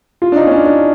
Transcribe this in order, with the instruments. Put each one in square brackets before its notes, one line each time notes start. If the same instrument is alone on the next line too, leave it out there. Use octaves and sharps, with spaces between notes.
[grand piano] F4
D4
D#4
C#4
D4
D4